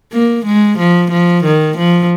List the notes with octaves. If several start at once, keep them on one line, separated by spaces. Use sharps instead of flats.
A#3
G#3
F3
F3
D#3
F3